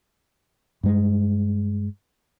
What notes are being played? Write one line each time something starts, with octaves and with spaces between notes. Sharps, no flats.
G2 G#3